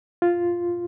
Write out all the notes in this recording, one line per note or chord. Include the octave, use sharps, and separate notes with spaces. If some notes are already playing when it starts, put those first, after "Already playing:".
F4